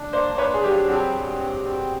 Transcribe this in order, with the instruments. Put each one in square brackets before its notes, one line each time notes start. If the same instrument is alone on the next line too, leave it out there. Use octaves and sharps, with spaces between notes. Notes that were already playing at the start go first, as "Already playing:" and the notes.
Already playing: [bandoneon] D4
[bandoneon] A#3 [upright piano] C5 D5
[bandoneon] D4 [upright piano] B4 C#5
[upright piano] G#4
[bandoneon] F#3 [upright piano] G4
[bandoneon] C4 [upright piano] F#4 G#4
[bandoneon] G2
C4
C4